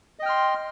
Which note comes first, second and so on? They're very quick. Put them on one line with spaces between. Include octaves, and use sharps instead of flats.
D#5 G5 F6 C6